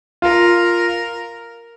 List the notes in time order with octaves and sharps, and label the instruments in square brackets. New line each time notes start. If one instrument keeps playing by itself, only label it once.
[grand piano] F4 [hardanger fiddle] A#4